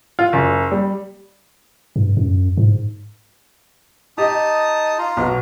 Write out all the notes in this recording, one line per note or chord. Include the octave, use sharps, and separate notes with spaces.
F4
F#1
G3
G2
F#2
G#2
D#4 G4 D#5 A5 D#6
F4 A#5 C6
B1 B3 F#4